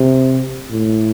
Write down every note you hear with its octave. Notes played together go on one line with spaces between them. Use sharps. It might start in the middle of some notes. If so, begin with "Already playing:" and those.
Already playing: C3
A2